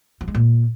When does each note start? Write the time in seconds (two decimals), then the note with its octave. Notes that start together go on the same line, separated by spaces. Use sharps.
0.21 F3
0.28 G#3
0.34 A#2